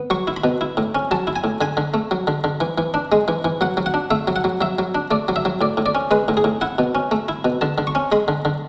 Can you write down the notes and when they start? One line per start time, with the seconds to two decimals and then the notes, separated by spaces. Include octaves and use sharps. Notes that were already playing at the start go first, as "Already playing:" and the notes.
Already playing: B3
0.10 F#3 C#6
0.27 E4
0.37 B5
0.44 B2
0.61 E4
0.77 A2
0.95 C#4
1.11 F#3 A5
1.27 E4
1.36 G#5
1.44 A2
1.61 D3 G#5
1.77 D3
1.94 A3
2.11 F#3
2.27 D3
2.44 D3
2.60 E3
2.78 E3
2.94 D4
3.12 G#3
3.28 E3
3.44 E3
3.61 F#3 F#5
3.77 F#3
3.86 F#5
3.94 D4
4.11 A3 E5
4.28 F#3
4.36 F#5
4.44 F#3
4.61 F#3 E5
4.79 F#3
4.95 D4
5.11 A3 D5
5.28 F#3
5.36 E5
5.45 F#3
5.61 A2 D5
5.77 A2
5.86 D5
5.95 C#4
6.11 G#3 B4
6.28 A2
6.37 G#4
6.44 A2
6.61 E4 F#5
6.78 B2
6.95 C#4
7.11 A3
7.28 E4
7.45 B2
7.61 D3 A5
7.78 D3
7.87 C#6
7.95 C#4
8.12 G#3 B5
8.28 D3
8.45 D3